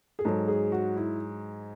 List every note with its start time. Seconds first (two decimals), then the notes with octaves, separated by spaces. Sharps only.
0.19 G#4
0.25 G#2 F#3 A4
0.48 G#4
0.72 F#4
0.96 E4